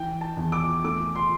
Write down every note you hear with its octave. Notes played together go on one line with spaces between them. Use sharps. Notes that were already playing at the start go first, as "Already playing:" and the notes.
Already playing: E3 G5
A5
E2
D6
A3 D6
C6